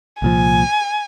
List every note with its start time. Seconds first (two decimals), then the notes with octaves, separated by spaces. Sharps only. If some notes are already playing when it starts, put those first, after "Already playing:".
0.22 C2 A#2 F3 G#5